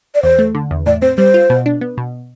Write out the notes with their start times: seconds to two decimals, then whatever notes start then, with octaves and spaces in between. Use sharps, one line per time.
0.15 D5
0.23 E2 C5
0.39 A3
0.55 D3
0.71 E2
0.86 A2 D5
1.02 C4 C5
1.18 G3 C5
1.34 F4
1.50 B2
1.66 D4
1.81 B3
1.98 B2